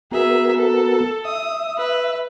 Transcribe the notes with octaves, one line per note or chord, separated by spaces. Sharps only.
B3 F#4 G#4 A#4 E5
A4
E5 D#6
B4